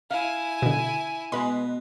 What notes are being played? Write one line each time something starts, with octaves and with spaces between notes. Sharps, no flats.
E4 F5 G#5
B2 D3
B2 G#3 B4 D#5 B5